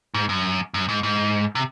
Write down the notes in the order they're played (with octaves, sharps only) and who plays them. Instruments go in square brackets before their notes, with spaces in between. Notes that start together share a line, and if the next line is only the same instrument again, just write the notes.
[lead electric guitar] G#2
F#2
F#2
G#2
G#2
C3